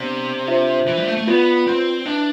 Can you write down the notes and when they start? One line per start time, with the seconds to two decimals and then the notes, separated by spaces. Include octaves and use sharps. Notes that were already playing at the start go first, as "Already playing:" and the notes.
Already playing: C3 B3 D4 G4 D5 F5
0.48 D4 F4 C5 E5
0.87 E3
0.97 G3
1.07 A3
1.17 A3
1.27 B3 F4 B4 D5
1.67 C4
2.06 D4 E4 B4 E5 A5